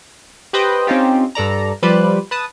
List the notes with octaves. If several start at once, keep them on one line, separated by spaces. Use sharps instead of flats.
G4 B4 C5 D#5 G5
C4 C#4 D#4 F4 G4
G2 A4 D5 A#5
F3 G3 B4 C5 D5
B4 A5 D#6